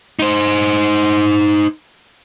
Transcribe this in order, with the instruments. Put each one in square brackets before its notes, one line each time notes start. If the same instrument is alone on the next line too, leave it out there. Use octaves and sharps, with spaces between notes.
[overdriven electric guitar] D#4 C5